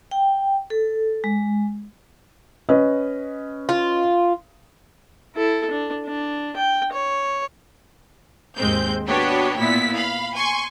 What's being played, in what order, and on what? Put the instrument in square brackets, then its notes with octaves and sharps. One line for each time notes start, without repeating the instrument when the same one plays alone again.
[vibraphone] G5
A4
G#3
[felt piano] C#4 B4 D#5
[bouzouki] F4
[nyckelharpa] E4 A4
D4
D4
G5
C#5
[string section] D#2 G#2 G#3 C4 G6
B3 D4 F#4 G4 C#5
A#2 B3 E4 B6
F5 B5
G#5 C6 C#6